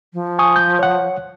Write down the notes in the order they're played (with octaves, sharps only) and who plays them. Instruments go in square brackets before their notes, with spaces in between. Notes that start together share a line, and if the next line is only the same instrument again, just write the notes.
[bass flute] F3
[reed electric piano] G#5 C#6 D#6
G6
C#5 F#5